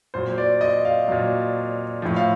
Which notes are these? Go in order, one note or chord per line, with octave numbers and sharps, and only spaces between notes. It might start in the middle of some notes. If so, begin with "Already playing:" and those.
A#2 F#3 C5
D5
D#5
F5
A#2 F#3
A2 F3
F5